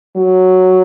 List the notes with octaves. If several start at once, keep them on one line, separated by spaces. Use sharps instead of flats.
F#3